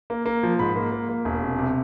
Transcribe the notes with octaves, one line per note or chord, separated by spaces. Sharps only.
A#3
A#3
F3
G#2 B5
A#3
A#3
A#3
E1
C3
C3